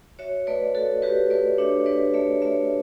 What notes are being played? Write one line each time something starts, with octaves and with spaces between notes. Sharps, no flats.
F#4 C#5 E5
A3 B4 D5
F#4 A4 C#5
F#4 G4 B4
A3 B4 D5
D4 C#5 E5
D4 B4 D5
A3 C#5 E5
A3 C#5 E5